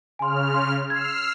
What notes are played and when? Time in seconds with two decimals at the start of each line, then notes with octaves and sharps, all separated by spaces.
0.19 C#3 G#5 C6 F6
0.54 C6
0.90 E6 F6 G#6 C7